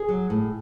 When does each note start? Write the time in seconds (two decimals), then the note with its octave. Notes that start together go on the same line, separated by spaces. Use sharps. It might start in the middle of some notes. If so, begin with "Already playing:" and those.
Already playing: G#4
0.09 F#3
0.30 A2